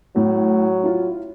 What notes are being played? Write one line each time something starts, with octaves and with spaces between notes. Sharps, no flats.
A2 F#3
E4 F4